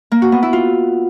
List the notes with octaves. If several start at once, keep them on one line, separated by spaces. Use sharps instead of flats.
A#3
F#4
B3
E4
F4